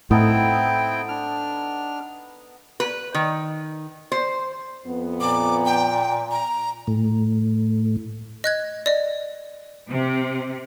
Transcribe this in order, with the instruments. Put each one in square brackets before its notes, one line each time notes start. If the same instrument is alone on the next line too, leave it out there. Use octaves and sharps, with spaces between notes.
[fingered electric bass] A2 [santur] B3 D#4 A4 [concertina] C4 E4 G5
[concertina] D4 F6
[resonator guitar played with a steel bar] B4
D#3
C5
[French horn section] F2 B3
[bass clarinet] A#2 [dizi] D6
[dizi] G5
A#5
[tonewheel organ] A2
[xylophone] D#5 F#6 G#6
D5 D#5
[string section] C3